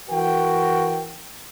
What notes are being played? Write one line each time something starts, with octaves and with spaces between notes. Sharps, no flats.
E3 F#4 A#4 G5